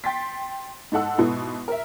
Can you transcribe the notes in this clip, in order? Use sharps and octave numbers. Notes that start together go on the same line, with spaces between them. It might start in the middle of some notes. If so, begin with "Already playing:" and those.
G5 C6 A6 B6
G#2 D#4 A4 F#5 E6
G#2 B2 B3 E4
A#4 E5